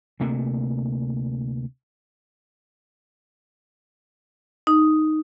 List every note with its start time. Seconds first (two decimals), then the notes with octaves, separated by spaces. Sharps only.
0.20 D2 C3 A3 A#3
4.67 D#4